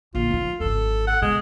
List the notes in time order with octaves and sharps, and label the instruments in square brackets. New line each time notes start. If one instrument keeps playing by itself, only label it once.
[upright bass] A#1 D3 [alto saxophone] F4
[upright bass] F3 D#4
[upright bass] G#1 F#2 [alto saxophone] A4
[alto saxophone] F#5
[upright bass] B2 [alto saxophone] G#3